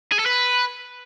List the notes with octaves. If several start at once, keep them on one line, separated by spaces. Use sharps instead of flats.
G#4
A4
B4